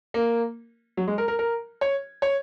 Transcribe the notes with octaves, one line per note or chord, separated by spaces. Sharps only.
A#3
F#3
G#3
A#4
A#4
A#4
C#5
C#5